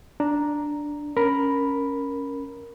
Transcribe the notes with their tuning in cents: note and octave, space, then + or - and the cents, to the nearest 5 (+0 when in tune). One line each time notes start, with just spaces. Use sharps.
D4 +0 A#5 +0
C#4 +0 A#4 +5 B5 +0